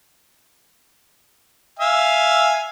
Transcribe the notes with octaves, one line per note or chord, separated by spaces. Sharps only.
E5 F5 G#5